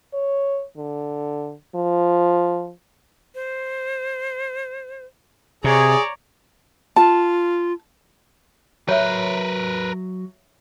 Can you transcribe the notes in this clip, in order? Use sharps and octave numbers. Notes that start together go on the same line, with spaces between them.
C#5
D3
F3
C5
C3 G#4 C#5 D5 A#5
F4 A5
F#3 A#4 B4 C#5 E5 F#6